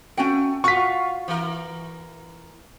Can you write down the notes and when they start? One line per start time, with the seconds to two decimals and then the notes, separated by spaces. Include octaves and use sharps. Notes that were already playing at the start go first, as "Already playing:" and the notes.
0.17 A3 C#4 F#4 G5
0.64 F4 F#4 F#5 C#6 B6
1.28 E3 A#4